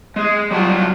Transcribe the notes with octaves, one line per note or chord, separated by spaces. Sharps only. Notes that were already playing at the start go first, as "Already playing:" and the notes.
G#3 G#4
F#3 G3 F4 F#4 A5